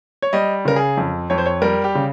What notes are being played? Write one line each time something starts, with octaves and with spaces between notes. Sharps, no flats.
C#5
G3 D#5
C#3 A#4
G#4
F2
F2 C#5
C5
C#5
G3 A#4
G4
C#3